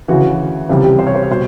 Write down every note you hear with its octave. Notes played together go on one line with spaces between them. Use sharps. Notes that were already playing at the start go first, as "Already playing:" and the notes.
D2 C#3 E3 F#4
C#2 C3 E3 G3
G4
C5
C#5
C5
C#5
B2 G3 C5